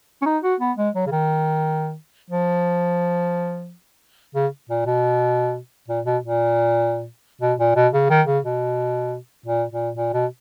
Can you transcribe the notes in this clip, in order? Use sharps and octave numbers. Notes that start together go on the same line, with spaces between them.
C#4
D#4
F#4
B3
G#3
F#3
C#3
D#3
F3
C#3
A#2
B2
A#2
B2
A#2
B2
A#2
B2
C#3
D#3
C#3
B2
A#2
A#2
A#2
B2